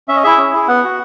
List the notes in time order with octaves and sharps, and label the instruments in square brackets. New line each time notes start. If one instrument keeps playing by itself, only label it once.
[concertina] C#4 E5
D#5
E4 G#4 E5
C#4
E4 G#4
B3 F#5
F#4